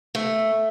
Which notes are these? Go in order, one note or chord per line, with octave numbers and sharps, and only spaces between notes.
A3